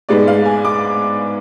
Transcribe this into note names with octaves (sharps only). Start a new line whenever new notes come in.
G#2 G#3 B3 D5
F5
G#5
D6